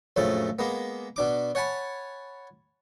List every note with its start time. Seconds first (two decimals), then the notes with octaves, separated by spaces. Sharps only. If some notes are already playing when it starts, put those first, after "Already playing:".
0.16 A#1 F#2 C#3 F3 A3 A4
0.59 G#3 A#3 B3
1.16 B2 D4 D6
1.55 C#5 F#5 G#5 A5 B5